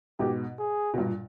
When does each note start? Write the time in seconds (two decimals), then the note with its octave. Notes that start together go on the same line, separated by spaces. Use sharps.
0.19 G#2 B2 G4
0.59 G#4
0.94 B2
0.98 G2 A#2